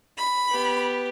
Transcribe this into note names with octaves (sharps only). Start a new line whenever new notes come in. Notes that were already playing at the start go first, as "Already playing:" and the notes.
B5
B3 G4